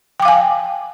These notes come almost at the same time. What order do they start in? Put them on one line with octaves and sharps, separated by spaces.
G5 D6 F5 G#5